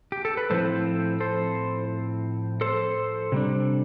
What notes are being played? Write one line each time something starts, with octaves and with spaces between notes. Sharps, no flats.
G4
A4
B4
A2 F3 C4 E4 A4 C5
A4 C5
A4 C5
C3 G3 D4